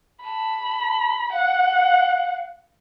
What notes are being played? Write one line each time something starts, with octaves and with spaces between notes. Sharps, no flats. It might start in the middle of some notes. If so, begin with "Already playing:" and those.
A5 B5
F5 F#5